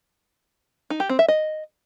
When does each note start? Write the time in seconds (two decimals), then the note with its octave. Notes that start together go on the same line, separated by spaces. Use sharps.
0.90 D#4
1.00 G4
1.09 C4
1.19 E5
1.28 D#5